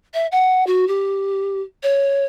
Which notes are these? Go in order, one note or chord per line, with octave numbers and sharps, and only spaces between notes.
E5
F#5
F#4
G4
C#5